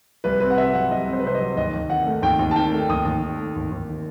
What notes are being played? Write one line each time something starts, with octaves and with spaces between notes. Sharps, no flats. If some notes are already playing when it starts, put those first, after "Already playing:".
C2 B4
C4 B4
F#5
C3 E5
F#3 F#5
C2 D#5
C4
C5
B4
C3 C5
D#5
F#3
D#2 D#5
D#2
D#3 F#5
A3
D#2 G5
D#2
A5
D#3 G5
A3
D#2 D#6
D#2
D#3
A3
D#2
D#2
D#3